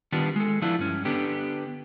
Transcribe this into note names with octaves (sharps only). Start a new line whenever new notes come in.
D#3 G3 B3 D4 F4
G#3 A4
D3 F3 B3 D4 E4 F4
G2 C#4
D3 B3 D4 G4